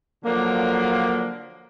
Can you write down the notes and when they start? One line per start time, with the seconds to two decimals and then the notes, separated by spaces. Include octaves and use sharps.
0.24 D3 F3 F#3 A#3